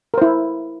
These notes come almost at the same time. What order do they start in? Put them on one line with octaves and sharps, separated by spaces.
A#4 C5 E4